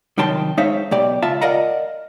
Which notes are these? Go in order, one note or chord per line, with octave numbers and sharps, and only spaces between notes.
C2 D#3 F#3 G5 A5 C6
G#3 D#4 C5 C#5 E5 F5
B1 B2 G4 D5
C#2 F4 E5 A5
A#4 D5 D#5 F5 F#5 A#5